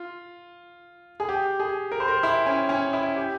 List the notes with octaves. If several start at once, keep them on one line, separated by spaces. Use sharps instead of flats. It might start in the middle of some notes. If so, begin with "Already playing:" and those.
Already playing: F4
G#4
G4
G#4
A#4
C5
A#4
E4
C#4
C#4
E4
G4